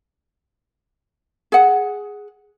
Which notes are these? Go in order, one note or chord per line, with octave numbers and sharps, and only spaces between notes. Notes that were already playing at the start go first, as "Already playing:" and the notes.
G#4 F#5